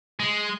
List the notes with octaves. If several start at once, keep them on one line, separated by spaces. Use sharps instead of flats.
G#3